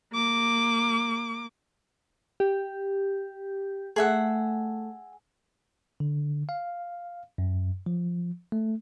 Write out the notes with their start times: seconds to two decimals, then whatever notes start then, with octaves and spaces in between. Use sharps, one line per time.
0.13 A#3 D6
2.40 G4
3.96 A3 G#4 E5 F#5
6.00 D3
6.49 F5
7.38 F#2
7.86 F3
8.52 A3